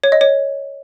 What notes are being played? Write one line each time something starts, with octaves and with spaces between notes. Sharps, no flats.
C#5
D#5
C#5